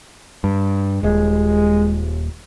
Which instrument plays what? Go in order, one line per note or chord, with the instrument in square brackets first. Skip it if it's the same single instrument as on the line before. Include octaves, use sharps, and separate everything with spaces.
[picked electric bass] G2
[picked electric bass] D#1 [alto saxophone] G#3